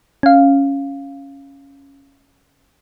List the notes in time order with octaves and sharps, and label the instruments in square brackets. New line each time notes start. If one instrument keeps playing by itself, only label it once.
[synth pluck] C#4 F5